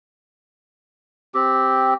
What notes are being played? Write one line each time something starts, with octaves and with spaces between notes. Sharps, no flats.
C4 G4